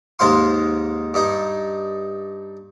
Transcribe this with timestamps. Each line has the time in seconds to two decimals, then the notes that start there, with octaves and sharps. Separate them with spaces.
0.19 D#2 G#2 G#3 C5 F5 C6
1.14 G2 D#4